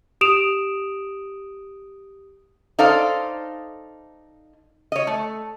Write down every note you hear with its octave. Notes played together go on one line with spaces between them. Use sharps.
G4 D#6 D7 E7 F7
D#4 A4 C5 D5 F5
C#5 D#5
A3